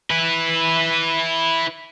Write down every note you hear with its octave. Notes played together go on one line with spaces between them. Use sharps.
E4 B4